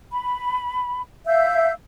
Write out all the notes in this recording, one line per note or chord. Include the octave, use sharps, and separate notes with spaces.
B5
E5 F5 E6 G6